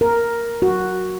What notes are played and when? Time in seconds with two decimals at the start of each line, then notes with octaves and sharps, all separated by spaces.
0.01 A#4
0.62 F#4